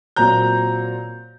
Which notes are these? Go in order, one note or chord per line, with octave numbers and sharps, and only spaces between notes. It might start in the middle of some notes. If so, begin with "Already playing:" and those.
A#2 F#3 C4 A#5 G6